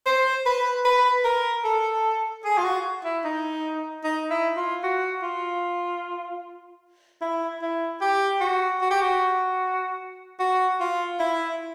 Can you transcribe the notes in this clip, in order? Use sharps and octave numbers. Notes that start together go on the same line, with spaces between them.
C5
B4
B4
A#4
A4
G#4
F4
F#4
E4
D#4
D#4
E4
F4
F#4
F4
E4
E4
G4
F#4
F#4
G4
F#4
F#4
F4
E4